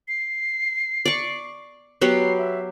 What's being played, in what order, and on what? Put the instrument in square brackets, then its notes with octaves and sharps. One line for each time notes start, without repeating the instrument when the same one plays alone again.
[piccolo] C7
[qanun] D5 C#6
[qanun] F#3 B3 G4 [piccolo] C7
[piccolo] E5